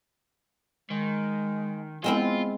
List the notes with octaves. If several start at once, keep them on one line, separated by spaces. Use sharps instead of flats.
D#3 G#3
G#3 B3 C4 E4 F4